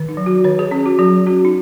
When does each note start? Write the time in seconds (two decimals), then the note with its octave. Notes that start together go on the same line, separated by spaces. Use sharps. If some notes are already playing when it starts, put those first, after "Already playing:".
Already playing: D#3
0.09 D#4
0.17 F#3
0.26 F#4
0.44 D#3 C#5
0.59 G#4
0.71 C#4 G#4
0.86 F#4
0.99 F#3 G#4
1.26 C#4 F#4
1.45 D#4